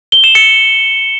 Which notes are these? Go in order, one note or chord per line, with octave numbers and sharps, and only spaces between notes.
G7
E7
C#7